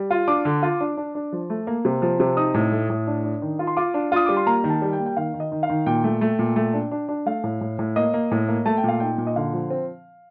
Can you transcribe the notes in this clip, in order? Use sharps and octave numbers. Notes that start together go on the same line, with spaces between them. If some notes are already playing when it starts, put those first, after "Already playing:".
Already playing: G3
F4
D4 D6
D3
F4
D4
D4
D4
F3
A3
A#3
C3
F3
C3
D#4 D#6
A2
A3
A2
D4
D4
D#3
F4
C6
F4 D6
D4
F4 D#6
G3 D6
C6
A#3 A#5
D#3
A5
G3
G5
A#3
G5
D#3 F5
D#3
D#5
D#3
F5
D#3
A#2 G5
A3
A3
A#2
A3
D4
D4
D4
A3 F5
A2
A2
A2
A#3 D#5
A#3
A2
A#3
A3 A5
G5
A#2 F5
D#4 G5
A#2
D#5
D3 F5
F3
C4